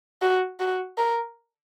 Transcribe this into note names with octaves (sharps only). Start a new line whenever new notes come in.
F#4
F#4
A#4